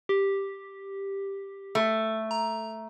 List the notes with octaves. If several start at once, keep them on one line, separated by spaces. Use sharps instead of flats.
G4
A3
A#5